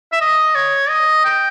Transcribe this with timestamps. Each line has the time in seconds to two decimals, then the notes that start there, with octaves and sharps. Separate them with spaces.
0.12 E5
0.21 D#5
0.55 C#5
0.89 D#5
1.25 G5